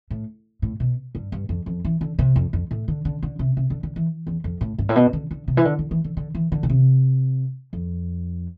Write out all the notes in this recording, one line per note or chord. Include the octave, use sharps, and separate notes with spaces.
A2
A2
B2
G2
G2
F2
F2
E3
D3
C3
F2
F2
A2
D3
D3
D3
C3
C3
D3
D3
E3
E2
F2
A2
G2
A2
B2
D3
D3
C3
E3
D3
D3
E3
D3
D3
E3
D3
B2
C3
F2